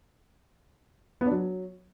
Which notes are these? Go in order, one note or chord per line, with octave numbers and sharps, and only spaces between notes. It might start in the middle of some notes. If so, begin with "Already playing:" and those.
B3
D4
F#3